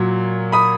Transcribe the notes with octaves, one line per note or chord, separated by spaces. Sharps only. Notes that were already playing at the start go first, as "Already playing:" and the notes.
Already playing: A#2 F#3
B5 D#6